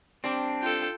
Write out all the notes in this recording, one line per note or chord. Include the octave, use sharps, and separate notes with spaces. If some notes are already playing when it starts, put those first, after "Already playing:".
G3 C4 D4
F4 A4 G5